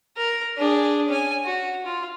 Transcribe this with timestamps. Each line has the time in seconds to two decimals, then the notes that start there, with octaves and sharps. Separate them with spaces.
0.17 A#4
0.57 D4 G#4
1.08 C#4 G#5
1.45 F#4
1.86 F4